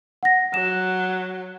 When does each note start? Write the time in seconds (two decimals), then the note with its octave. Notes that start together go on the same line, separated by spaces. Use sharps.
0.23 F#5 A#6
0.54 F#3 E7